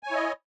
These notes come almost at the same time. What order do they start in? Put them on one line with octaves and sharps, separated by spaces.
G#5 C#5 E4 D#5